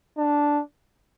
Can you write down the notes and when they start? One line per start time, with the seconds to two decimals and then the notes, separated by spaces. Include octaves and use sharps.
0.18 D4